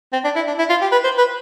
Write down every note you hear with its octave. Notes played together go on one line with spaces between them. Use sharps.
C4
D4
E4
D4
E4
F4
G4
B4
C5
B4